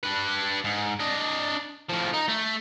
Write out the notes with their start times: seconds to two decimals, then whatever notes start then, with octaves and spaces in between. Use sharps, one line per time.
0.04 D4 B4
0.64 G#2
0.99 D4 D#5
1.89 A2 F3
2.13 D#4
2.28 A3